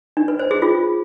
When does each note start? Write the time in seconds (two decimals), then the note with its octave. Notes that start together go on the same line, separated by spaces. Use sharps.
0.17 D4
0.28 B4
0.39 C5
0.51 G#4
0.62 F4